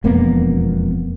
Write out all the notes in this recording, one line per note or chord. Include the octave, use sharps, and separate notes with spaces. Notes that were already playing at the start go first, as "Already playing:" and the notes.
E1 F2 A#3 B3